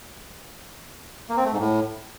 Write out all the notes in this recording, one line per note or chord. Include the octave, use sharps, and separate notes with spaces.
A#3
C4
A3
G#2
A2